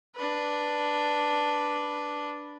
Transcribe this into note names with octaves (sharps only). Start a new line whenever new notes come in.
D4 B4